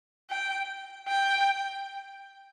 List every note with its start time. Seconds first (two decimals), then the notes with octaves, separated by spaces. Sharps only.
0.30 G5
1.08 G5